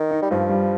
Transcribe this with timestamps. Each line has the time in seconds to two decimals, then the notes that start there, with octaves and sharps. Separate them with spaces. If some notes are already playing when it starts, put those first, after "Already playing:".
Already playing: D#3
0.11 D#4
0.22 G3
0.31 G2 F3
0.49 G3